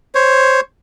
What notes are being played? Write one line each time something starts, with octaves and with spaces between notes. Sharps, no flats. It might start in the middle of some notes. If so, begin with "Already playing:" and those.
C5 C#5